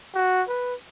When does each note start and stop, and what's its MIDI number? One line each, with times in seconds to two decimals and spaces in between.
0.14 0.43 66
0.48 0.74 71